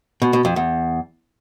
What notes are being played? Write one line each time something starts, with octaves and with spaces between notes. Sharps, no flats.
B2
B2
F2
E2